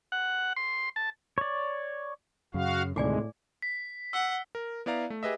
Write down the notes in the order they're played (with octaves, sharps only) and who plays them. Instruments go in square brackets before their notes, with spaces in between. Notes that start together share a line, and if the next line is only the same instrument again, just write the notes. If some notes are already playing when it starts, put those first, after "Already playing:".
[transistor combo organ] F#5
C6
A5
[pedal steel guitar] C#5 D5
[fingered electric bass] F#2 [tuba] C#3 [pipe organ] F#4 F5
[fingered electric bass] D2 C3 D#3 [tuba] A2 [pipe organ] G#3 [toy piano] D5 G#5 D6
[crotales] B6
[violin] F#5 [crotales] E6
[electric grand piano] A#4
B3 E4 D5 F5 A#5
A3
G4 G#4 B4 D#5 E5